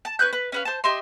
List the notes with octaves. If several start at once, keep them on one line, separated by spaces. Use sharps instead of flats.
A5
C#4 B4 F#6 G6
B4
C#4 B4 F5
C5 A5
G4 D#5 E5 C6